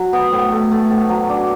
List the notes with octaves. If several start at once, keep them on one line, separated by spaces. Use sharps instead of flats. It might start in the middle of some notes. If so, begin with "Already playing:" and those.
Already playing: F#3
B3
A2
A3
A3
A2
F#3
D4